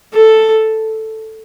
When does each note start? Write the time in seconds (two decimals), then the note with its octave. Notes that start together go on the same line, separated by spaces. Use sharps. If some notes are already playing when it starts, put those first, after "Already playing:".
0.14 A4